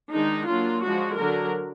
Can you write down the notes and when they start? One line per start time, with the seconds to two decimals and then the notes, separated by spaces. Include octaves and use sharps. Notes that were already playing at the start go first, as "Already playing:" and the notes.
0.12 D#3 G#3 D4 D#4
0.47 F#3 A#3 D4 F4
0.83 F3 G#3 D4 F#4
1.17 D3 F#3 D4 A#4